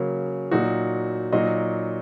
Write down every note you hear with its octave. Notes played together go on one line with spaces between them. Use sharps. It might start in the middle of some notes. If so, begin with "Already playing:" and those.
Already playing: C#3 F#3 A#3 C#4
A#2 F#3 D#4 F#4
A#2 F#3 D#4 F#4 D#5